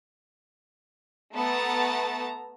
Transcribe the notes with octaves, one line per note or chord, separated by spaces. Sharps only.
A3 B3 A5 A#5 A6